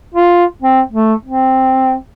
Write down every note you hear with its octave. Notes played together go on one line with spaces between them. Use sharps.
F4
C4
A3
C4